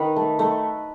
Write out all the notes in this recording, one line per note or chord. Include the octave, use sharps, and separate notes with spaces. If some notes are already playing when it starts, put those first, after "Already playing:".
Already playing: D#3 B4
A3
A3